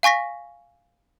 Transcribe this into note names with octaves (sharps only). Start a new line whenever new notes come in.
F5 G#5 C#6 A#6 B6